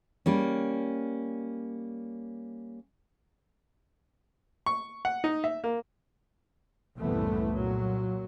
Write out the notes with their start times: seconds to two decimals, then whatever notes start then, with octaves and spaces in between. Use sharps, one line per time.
0.26 G3 A#3 C#4
4.66 C#6
5.05 F#5
5.24 D#4
5.44 E5
5.64 A#3
6.97 F#1 C2 A2 E3 A3 B3
7.54 A#2 F#3